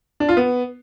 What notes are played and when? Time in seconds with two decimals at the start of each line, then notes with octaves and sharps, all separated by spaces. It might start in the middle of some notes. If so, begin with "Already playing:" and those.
0.20 D4
0.29 F4
0.37 B3